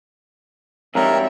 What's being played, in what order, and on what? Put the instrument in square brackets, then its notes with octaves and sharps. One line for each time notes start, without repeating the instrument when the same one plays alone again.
[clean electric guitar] F2 G#2 G3 [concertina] A#4 [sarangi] C#5 [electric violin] E5